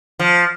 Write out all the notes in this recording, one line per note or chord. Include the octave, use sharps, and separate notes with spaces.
F3